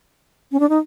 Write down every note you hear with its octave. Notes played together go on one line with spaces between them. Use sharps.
C#4
D4
D#4